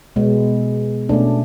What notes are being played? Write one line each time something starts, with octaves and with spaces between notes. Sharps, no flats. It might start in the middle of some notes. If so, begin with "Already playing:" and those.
B2 G#3 B3
B2 A3 C#4 D4